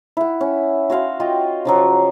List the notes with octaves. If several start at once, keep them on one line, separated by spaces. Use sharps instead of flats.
E4 F#5
C#4
F#4 C#5 F5 C6
F4 D#5 G5
C#3 F3 F#3